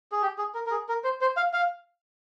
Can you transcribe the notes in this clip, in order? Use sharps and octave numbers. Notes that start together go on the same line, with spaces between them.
G#4
G4
G#4
A#4
A#4
G#4
A#4
C5
C5
F5
F5